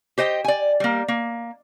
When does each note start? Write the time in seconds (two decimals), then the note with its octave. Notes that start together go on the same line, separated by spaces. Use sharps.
0.18 G4 C5 D#5 G5
0.44 D5 G#5
0.80 G3 A#3
1.08 A#3